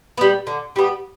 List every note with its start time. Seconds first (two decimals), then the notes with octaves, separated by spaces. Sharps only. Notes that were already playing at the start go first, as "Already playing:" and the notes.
0.17 G3 B3
0.47 D3
0.76 G3 B3